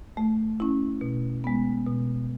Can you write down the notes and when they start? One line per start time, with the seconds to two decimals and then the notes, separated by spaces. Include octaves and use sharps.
0.17 A3
0.60 C#4 E4
1.01 B2
1.44 G#3 B3
1.86 B2